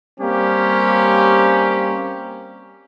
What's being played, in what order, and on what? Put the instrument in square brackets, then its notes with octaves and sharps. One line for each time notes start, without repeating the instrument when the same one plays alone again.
[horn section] G3 A#3 C4 C#4 G4